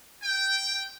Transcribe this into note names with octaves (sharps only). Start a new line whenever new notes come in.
G5